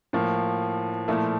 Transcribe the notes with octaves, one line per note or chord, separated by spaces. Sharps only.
A2 F3 A#3
A#2 F3 A3 E4